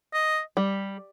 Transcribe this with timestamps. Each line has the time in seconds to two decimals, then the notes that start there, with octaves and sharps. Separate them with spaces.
0.13 D#5
0.57 G3